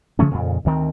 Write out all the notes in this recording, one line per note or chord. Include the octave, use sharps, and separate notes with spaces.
C#3 F3 A3 C#4
F2 A#2 C#3
D2 D#3 C4